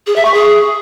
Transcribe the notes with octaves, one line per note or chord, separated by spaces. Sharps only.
G#4
E5
C#6
G#4